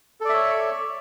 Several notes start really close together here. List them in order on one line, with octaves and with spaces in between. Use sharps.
A4 D5 E5 C#5